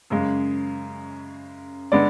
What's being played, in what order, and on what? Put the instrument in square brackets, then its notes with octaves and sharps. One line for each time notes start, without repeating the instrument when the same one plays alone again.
[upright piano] F#2 C#3 G#3
D3 G#3 B3 D5